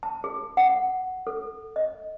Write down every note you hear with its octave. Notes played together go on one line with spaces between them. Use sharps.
A5
G#4
F#5
A4
D#5